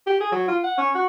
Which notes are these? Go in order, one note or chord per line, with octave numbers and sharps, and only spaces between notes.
G4
G#4
F#3
F4
F#5
C#4
F#4